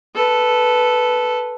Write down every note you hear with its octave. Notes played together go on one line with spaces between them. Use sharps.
A4 B4